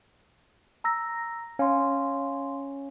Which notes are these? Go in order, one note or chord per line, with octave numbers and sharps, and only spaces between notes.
A#5 E6 A#6
C#4 F5 C6